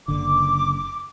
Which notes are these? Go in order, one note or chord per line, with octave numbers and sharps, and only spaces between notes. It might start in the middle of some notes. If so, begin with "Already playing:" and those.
F#1 D3 D6